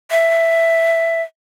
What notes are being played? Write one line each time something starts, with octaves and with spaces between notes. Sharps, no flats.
E5